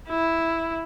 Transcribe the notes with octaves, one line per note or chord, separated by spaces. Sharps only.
E4